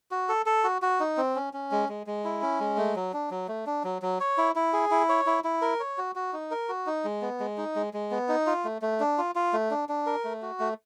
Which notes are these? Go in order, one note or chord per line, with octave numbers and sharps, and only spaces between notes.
F#4
A4
A4
F#4
F#4
D#4
C4
C#4
C#4
G#3
G#3
G#3
E4
C#4
G#3
A3
F#3
D4
F#3
A3
D4
F#3
F#3
C#5
E4
E4
G#4
E4
C#5
E4
E4
A#4
C#5
F#4
F#4
D#4
A#4
F#4
D#4
G#3
B3
G#3
D#4
G#3
G#3
B3
D#4
F4
A3
A3
D4
F4
F4
A3
D4
D4
A#4
A3
F#4
A3